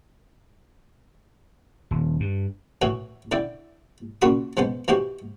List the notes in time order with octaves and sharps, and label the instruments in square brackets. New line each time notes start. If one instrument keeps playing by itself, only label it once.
[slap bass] D#1
G2
[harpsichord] A2 E3 F#4
D3 E4 D5 G5
A#2 C#3 F#3 F#4 B5 D#6
F3 G#3 B3 C5
E3 D#4 F#4 G4 C5